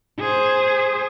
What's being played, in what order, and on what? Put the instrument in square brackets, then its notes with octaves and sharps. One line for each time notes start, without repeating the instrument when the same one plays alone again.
[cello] G#4 C5